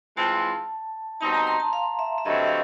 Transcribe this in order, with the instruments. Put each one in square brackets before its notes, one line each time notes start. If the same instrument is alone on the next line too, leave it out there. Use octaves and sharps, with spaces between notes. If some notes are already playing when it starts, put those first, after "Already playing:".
[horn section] E3 G#3 C4 F4 [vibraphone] A5
[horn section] B2 G3 C4 D#4 [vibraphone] A5
[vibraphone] A#5
C6
A5
F5
E5
E5
[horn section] G2 D3 F#3 A3 C4 [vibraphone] D#5
[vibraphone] F5